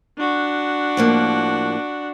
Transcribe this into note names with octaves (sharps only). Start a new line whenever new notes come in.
D4 F#4
A2 F3 A#3